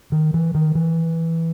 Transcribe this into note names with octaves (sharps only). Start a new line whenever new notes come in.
D#3
E3
D#3
E3